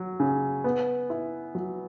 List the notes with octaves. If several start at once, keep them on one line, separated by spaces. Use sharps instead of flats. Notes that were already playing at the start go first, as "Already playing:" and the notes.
Already playing: F#3
C#3
B3
E4
F#3